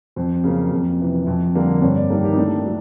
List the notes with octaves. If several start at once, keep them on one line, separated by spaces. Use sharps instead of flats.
F2 C5
C#3 F#3 A#3
F2
C3 E3
F2
D3 G3 A#3
G2 C#5
D5
D#3 G3 A#3 A4
G4
D#4
A2 D4
F#3